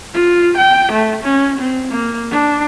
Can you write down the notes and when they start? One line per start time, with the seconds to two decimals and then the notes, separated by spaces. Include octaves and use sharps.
0.14 F4
0.57 G5
0.92 A3
1.23 C#4
1.58 C4
1.91 A#3
2.31 D4